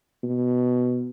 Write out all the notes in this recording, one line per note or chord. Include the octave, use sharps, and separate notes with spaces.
B2